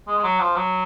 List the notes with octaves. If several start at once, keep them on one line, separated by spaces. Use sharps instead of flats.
G#3
G#3
F#3
F3
F#3